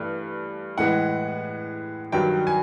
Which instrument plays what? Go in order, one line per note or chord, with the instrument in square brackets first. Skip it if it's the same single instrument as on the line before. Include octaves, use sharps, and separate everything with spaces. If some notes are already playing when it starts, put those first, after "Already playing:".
Already playing: [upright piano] G2 E3 A3
[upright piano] A2 E3 G#3 [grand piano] F#5
[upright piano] G2 D#3 F#3 [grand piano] G5
[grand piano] G#5